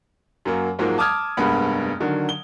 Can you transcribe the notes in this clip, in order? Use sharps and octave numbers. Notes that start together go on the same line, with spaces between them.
F#2 F#3 A#3
G#2 F3 F#3 G#3 A#3
A5 D6 D#6 F6 G#6
F1 G2 G#3 A#3 B3 B5
D3 D#3 F#3
G7